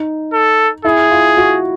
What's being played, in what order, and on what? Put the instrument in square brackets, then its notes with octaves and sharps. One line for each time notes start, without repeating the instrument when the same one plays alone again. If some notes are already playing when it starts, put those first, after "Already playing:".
Already playing: [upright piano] D#4
[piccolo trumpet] A4
[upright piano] E4 [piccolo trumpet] G#4
[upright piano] F4
F#4